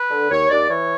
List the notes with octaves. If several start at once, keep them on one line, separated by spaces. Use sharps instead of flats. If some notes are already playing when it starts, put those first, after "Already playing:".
Already playing: B4
D3
D#2 C#5
D#2 D5
E3 C#5